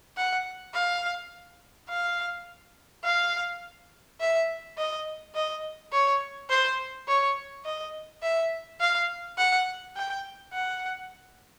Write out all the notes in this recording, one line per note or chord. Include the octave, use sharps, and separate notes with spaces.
F#5
F5
F5
F5
E5
D#5
D#5
C#5
C5
C#5
D#5
E5
F5
F#5
G5
F#5